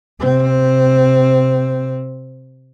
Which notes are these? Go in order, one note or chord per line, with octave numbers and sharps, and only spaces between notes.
C3 C4